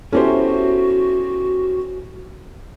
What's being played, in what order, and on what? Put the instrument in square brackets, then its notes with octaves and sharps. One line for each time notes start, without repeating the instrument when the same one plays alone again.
[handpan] B3 E4 A4 [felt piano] C#4 G4 C5 [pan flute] F#4